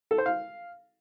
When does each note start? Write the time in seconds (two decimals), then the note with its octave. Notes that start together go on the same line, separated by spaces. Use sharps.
0.11 A4
0.18 C5
0.26 F5